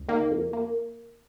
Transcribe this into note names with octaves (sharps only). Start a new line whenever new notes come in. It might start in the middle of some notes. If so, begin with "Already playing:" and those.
Already playing: C#2
D#3 A#3
F2
A#3